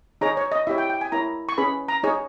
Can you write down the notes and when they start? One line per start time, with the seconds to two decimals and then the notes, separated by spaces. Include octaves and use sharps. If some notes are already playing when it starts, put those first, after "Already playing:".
0.21 D#4 G#4 C#5 A#5
0.37 C#5
0.52 D#5
0.67 E4 G4 C#5 E5
0.78 G5
0.90 G5
1.01 G#5
1.12 E4 A#4 C#5 A#5
1.49 C#6
1.58 C#4 G#4 B4 B5
1.88 A#5
2.03 D#4 G#4 C#5